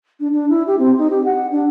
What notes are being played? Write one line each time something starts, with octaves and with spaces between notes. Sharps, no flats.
D4
D4
E4
G4
C4
D#4
G4
F#5
D4